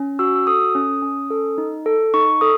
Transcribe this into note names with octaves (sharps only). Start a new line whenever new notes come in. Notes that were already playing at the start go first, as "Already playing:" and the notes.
Already playing: C#4
F#4 E6
E6
A4 D#6
C#4
C#4
A4
D#4
A4
D#4 C#6
A4 D#6